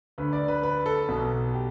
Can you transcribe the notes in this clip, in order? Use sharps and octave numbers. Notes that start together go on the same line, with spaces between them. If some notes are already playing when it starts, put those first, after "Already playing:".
D2 D3 B4
D5
B4
B4
A4
B1 B2
G4